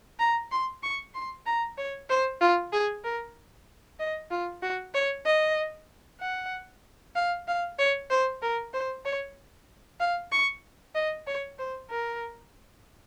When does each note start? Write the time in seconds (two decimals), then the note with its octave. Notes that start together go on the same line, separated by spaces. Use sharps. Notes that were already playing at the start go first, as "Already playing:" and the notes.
0.19 A#5
0.51 C6
0.83 C#6
1.14 C6
1.46 A#5
1.78 C#5
2.09 C5
2.41 F4
2.73 G#4
3.04 A#4
3.99 D#5
4.31 F4
4.62 F#4
4.94 C#5
5.26 D#5
6.20 F#5
7.15 F5
7.48 F5
7.79 C#5
8.10 C5
8.42 A#4
8.73 C5
9.05 C#5
10.00 F5
10.32 C#6
10.95 D#5
11.27 C#5
11.59 C5
11.90 A#4